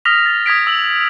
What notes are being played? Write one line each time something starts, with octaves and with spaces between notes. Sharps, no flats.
D#6 F6 A#6 B6 F7
A6 A#6
D#6 G#6 B6 D7
E6 F#7